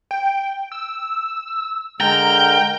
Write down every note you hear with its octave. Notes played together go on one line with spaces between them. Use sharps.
G5
E6
D3 G#3 A#4 G5 A#5